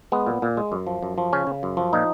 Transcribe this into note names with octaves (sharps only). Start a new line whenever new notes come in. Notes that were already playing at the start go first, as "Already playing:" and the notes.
G#3 B3
A#2
A#2
G#3
F#2
F3
F#2
F3
C#3 C#4
C#3
F#2
F3
A#2 D#4